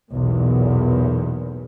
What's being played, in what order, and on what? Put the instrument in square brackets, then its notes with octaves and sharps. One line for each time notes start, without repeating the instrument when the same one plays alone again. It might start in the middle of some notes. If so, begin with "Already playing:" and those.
[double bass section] B1 E2 A#2